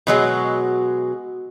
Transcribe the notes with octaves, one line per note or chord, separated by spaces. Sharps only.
B2 F#3 G#3